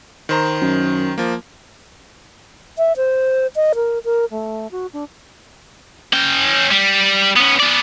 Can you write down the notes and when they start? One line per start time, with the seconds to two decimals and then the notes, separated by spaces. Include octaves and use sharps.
0.29 D#3 C5 A#5
0.62 F#2
1.18 F3 A#3
2.78 E5
2.97 C5
3.56 D#5
3.75 A#4
4.05 A#4
4.31 A3
4.71 F#4
4.94 D4
6.13 C#4 G5
6.71 G3
7.36 B3 C#4
7.60 B3 D5